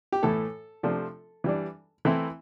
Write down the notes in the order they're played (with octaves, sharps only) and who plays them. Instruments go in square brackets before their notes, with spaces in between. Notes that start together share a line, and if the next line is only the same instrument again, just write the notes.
[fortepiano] G4
A2 E3 A3 A4
C3 F3 A3 D4
E3 G3 D4
E3 A3 C4 E4